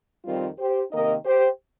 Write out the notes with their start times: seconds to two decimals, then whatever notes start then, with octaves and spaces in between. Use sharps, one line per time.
0.25 F2 D#3 G3 C4 F4 A#4
0.59 G4 C5
0.91 C3 D#3 A#3 D#4 A#4 D#5
1.25 G4 C5